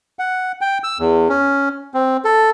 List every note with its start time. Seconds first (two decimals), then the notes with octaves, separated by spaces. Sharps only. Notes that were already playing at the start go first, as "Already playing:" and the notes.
0.19 F#5
0.61 G5
0.84 E6
0.99 E2
1.29 C#4
1.94 C4
2.25 A4